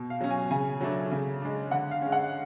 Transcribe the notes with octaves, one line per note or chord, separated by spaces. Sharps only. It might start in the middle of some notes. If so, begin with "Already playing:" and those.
Already playing: B2
F5
F#3 C#4
G#5
C#3 G#5
F#3 A3 D4
C#3
G#3 D4
D3 F#5
F5
G#3 C#4
F#5